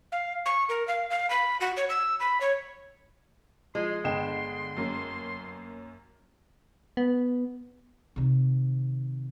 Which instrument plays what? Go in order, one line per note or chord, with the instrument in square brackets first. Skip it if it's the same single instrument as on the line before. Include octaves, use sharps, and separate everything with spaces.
[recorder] F5
C#6
A#4
F5
F5
B5
F#4
C#5
E6
B5
C#5
[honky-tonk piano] F3 [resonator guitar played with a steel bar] G#3 [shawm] C6
[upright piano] G1 D#5 G5 [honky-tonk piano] D3 E7 [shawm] C6
[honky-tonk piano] F#2 A#3 C#4
[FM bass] B3
[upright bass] C3 D#3